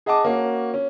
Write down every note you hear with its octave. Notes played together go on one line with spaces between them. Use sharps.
G#4 D#5 F#5 A5 D6
A#3 C#4 F#4
C#4